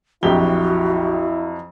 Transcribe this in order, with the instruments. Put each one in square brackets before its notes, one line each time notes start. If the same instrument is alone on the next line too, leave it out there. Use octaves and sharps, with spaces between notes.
[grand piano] A#1 G4 G7 [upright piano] F2 F#3 [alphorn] E4 [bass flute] F#4